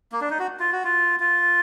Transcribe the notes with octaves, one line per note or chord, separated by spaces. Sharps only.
A#3
D4
D#4
F#4
F4
F#4
F4
F4